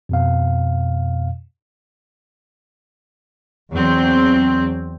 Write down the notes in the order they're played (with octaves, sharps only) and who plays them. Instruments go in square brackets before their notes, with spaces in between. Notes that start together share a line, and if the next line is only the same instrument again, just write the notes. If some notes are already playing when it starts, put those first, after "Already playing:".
[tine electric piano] F2 B2 F5
[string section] E2 F#3 C4